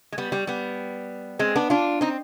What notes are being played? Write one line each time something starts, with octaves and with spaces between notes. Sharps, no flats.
G#3
G3 B3
G3
G3 B3
G#3 C4
B3 D4
D4 F4
C4 D#4